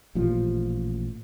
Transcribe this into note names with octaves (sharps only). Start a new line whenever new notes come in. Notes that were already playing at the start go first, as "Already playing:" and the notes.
A1 A#2 F3